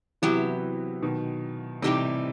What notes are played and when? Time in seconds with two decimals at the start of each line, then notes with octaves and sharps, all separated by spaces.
0.22 C3 E3 F#3 B3 E4 G4
1.02 B2 D#3
1.82 A2 C3 E3 G3 D#4 G4